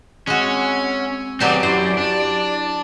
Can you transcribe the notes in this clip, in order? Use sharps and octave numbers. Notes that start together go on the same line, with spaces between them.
G#3 C4 C#4 F#4 E6
F#3 C4 G4 G#4 B4 D5 A5
F#2 E4 G4 C5 B5
D4